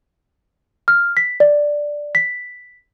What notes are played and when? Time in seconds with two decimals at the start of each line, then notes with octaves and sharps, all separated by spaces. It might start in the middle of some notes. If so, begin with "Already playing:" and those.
0.88 F6
1.17 B6
1.40 D5
2.15 B6